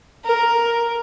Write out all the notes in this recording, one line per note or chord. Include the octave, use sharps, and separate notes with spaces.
A#4